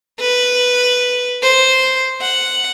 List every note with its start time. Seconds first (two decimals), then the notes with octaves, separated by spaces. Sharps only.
0.20 B4
1.43 C5
2.21 F#5